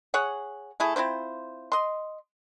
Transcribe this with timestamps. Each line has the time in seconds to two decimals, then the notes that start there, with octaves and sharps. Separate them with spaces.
0.14 G#4 C#5 F#5
0.80 A3 E4 G#4
0.96 C4 E4 F4 C5
1.72 D#5 C6